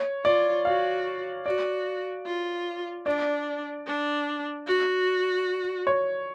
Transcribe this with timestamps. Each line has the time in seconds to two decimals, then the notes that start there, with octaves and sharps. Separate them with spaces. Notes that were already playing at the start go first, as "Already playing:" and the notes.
Already playing: C#5
0.25 F4 D5
0.65 F#4 F5
1.45 F#4 D5
2.26 F4
3.06 D4 D5
3.87 D4
4.67 F#4
5.87 C#5